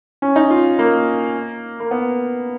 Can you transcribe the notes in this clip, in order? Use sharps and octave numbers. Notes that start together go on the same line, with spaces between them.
C#4
D#4
F4
A#3
A#3
B3